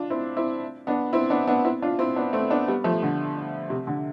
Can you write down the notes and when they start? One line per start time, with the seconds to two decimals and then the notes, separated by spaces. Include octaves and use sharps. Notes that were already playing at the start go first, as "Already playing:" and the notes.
Already playing: D4 F4
0.10 C4 E4
0.37 C4 E4
0.87 B3 D4
1.13 C4 E4
1.30 B3 D4
1.47 B3 D4
1.65 C4 E4
1.82 D4 F4
1.99 C4 E4
2.16 B3 D4
2.33 A3 C4
2.50 B3 D4
2.68 G3 B3
2.84 F3 A3
3.02 D3
3.70 C3
3.87 D3